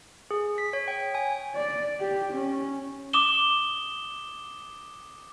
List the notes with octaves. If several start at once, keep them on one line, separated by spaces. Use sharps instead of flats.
G#4
B6
C#5
G5
G#5
D5
G4
C#4
D6 D#6 E7 G7